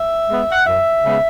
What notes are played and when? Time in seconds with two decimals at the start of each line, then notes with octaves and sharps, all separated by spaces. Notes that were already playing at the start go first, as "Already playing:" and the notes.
Already playing: E5
0.28 G#3 B3
0.52 F#5
0.66 F#2 E5
1.03 C#3 G#3 B3